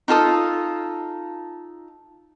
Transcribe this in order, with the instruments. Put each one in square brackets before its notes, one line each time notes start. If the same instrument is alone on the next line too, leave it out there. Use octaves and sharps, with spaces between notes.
[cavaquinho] D#4 F4 A4 D#6